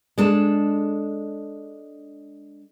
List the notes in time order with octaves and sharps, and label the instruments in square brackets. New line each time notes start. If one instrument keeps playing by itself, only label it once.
[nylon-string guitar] G#3 D4 A4